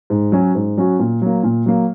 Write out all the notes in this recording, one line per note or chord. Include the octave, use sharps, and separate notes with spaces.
G#2
F#3 C#4 F#4
G#2
F#3 C#4 F#4
A#2
F#3 A#3
A#2
F#3 A#3